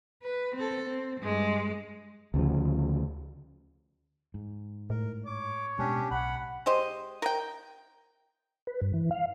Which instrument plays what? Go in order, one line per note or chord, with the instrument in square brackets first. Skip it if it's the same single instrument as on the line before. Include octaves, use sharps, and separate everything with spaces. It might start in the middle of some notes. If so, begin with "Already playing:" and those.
[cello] B4
C4 A4
C4
G2 G#3
[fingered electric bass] D2 C#3 F3
G#2
[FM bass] A2 [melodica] A#4
[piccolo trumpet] C#5 [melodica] D6
[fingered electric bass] B2 G#3 B3 [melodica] C#4 D4 G4
[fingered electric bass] B1 [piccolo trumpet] F#5 [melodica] B5
[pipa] G#3 G4 C5 D#5
A#4 D#5 G5
[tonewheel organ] B4
G2
E3
F5